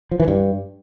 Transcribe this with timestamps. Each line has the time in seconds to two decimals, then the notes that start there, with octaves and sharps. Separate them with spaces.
0.11 F3
0.20 E3
0.28 G2